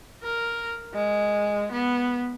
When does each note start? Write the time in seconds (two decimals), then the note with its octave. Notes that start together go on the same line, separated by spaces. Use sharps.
0.23 A#4
0.95 G#3
1.72 B3